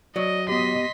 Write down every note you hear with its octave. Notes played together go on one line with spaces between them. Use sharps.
F#3 D5 D#5
B3 G4 D#5 C6 B6